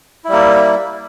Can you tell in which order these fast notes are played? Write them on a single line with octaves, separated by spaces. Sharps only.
E4 G3 A#3